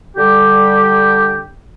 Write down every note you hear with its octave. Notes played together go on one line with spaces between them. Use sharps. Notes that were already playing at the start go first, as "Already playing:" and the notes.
D3 G3 G4